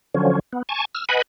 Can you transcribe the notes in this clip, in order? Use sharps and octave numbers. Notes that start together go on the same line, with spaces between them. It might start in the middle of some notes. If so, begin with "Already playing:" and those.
D3 F3 F#3 C#4
B3
G#5 A5 C#6
E6 F6
B4 D#5 F#5 G#5 B5